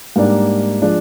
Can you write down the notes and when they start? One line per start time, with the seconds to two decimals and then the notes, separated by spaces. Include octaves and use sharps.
0.16 G#2 G3 A#3 D4
0.82 F3 G#3 D4